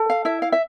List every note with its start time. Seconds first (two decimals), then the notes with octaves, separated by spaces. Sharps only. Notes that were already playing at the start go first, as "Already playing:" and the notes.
Already playing: A4
0.10 F5
0.25 E4 E5
0.42 F5
0.52 E5